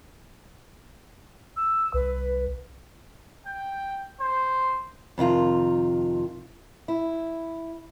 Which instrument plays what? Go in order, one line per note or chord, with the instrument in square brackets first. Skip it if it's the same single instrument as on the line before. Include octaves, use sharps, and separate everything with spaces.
[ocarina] E6
[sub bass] C2 [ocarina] B4
[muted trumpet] G5
C5
[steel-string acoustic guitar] F2 C3 D#3 F4
E4